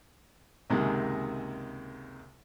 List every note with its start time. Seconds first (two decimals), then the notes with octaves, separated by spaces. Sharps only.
0.70 C#2 F#2 C3 D#3 G#3 A#3